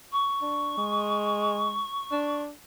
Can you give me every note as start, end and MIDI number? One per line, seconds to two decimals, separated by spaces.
0.12 2.42 85
0.42 0.73 62
0.77 1.86 56
2.12 2.51 62